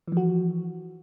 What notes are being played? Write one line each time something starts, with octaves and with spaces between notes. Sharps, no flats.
E3 F3 F#4